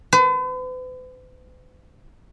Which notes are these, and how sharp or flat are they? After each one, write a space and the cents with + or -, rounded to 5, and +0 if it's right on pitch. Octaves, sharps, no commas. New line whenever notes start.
B4 +45